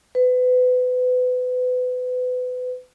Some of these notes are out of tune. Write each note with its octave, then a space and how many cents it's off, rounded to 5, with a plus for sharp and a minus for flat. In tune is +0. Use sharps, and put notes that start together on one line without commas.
B4 +30